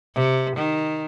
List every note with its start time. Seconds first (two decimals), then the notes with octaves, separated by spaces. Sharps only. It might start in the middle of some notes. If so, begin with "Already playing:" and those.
0.15 C3
0.56 D#3